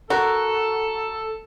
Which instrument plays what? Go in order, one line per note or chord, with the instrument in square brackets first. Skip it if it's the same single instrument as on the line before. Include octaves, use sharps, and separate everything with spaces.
[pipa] F#4 [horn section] A4 [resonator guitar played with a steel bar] A#4